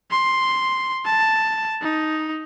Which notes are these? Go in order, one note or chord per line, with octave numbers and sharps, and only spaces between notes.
C6
A5
D#4